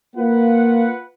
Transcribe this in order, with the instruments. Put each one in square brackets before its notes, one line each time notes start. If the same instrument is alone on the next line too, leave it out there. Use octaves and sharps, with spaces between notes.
[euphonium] A#3 [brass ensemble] F4 B4 F#5